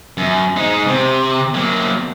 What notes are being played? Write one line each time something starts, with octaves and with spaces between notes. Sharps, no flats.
F#2
G#3 D#4
C3
F#3 A#3